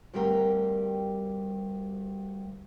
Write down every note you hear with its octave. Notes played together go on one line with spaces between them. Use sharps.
D2 G2 G3 C4 A#4 G5